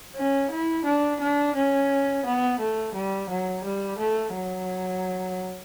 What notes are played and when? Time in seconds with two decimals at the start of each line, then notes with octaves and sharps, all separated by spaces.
0.16 C#4
0.51 E4
0.85 D4
1.21 D4
1.55 C#4
2.25 B3
2.59 A3
2.95 G3
3.30 F#3
3.64 G3
3.99 A3
4.34 F#3